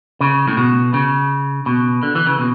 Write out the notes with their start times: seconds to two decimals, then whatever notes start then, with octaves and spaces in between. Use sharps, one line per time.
0.21 C#3
0.48 A2
0.57 B2
0.94 C#3
1.66 B2
2.03 D3
2.15 E3
2.27 C#3
2.39 B2